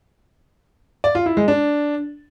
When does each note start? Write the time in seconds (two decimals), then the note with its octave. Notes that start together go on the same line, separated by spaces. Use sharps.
1.04 D5
1.15 F4
1.26 E4
1.37 G#3
1.48 D4